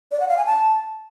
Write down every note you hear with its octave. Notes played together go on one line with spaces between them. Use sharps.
D5
F#5
F5
G#5
A5